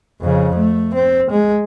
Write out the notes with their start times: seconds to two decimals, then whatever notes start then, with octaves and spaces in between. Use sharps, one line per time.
0.21 F2 C#3
0.55 A3
0.94 C4
1.31 G#3